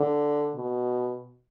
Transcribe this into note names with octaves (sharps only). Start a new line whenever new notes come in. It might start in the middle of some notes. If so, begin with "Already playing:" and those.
Already playing: D3
B2